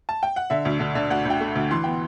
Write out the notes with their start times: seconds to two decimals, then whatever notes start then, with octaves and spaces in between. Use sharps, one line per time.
0.09 A5
0.23 G5
0.36 F#5
0.50 D3 E5
0.65 D2
0.80 D3
0.95 D3
1.10 D2 F#5
1.25 D2
1.30 G5
1.40 A3
1.56 D2
1.71 E3 C6
1.84 B3 G5